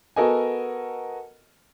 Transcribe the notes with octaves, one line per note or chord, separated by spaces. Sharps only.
B3 F#4 A4 A#4 D#5 G#5